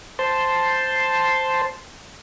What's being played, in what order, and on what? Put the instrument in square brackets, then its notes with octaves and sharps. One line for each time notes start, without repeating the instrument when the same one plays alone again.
[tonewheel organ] C5 A5 C6